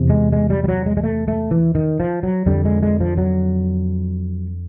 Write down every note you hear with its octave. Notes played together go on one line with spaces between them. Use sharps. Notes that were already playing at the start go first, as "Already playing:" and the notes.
Already playing: E2 C3
G#3
G#3
G3
G3
F#3
G#3
G#3
A3
A3
E3
D#3
F3
F#3
F2 D3 G3
G#3
G#3
F3
F#3